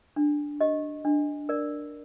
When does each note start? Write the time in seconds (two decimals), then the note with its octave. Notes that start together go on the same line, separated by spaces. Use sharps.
0.16 D4
0.61 G4 D#5
1.05 D4
1.49 A#4 D5